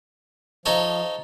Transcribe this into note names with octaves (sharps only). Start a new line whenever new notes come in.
F3 D#4 A4 C#5